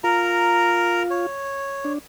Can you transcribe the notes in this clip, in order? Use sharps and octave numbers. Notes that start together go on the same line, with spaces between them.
F4 A#4 A#5
C#5
D4